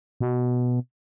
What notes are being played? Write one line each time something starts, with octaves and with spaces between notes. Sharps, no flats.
B2